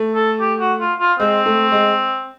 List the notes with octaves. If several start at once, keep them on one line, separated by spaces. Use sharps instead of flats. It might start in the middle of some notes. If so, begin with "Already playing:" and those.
Already playing: A3
A4
G4
F#4
F4
F4
G#3 C4
A3
G#3